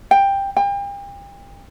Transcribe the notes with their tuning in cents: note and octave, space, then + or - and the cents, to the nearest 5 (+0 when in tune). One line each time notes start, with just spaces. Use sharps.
G5 +10
G5 +35